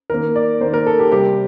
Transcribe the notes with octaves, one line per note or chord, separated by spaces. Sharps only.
D#3 A#3 A#4
D5
D#3 A#3 C5
A#4
A4
G4
C3 G3 C4 G4